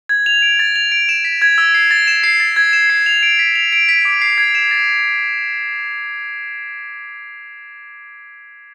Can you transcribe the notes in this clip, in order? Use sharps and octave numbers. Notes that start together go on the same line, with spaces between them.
G#6
F7
D7
A6
F7
D7
E7
B6
G#6
E6
C7
A6
E7
C7
A6
G#6
E7
C7
F7
D7
B6
F7
D7
B6
D6
C7
G#6
E7
A6